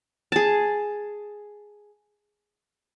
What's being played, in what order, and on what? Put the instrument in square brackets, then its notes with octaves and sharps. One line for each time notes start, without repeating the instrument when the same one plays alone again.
[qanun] G#4 A5